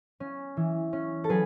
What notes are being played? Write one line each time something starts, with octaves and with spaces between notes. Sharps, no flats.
C#4
E3
C#4
A4
F#3 G#4 B4